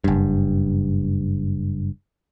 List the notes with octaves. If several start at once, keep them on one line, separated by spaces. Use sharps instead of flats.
F#1 G2